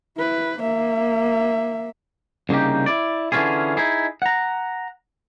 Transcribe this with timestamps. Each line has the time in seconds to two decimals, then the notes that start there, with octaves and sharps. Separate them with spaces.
0.18 E4 B4
0.59 A#3 E5
2.49 C2 C#3 A#3 D#4 G4
2.86 E4 D5
3.32 D3 E3 G3 C#4 F4 G#4
3.77 D#4 E4 G#4
4.22 F#5 A#5